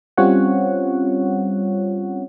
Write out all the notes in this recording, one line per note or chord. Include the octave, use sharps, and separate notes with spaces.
G3 C4 C#4 F4 C#5 F#5